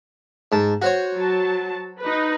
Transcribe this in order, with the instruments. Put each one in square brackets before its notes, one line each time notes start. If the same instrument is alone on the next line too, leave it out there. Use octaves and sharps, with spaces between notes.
[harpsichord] G#2 A5
F#4 C5 C#5
[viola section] F#3 A5
D#4 B4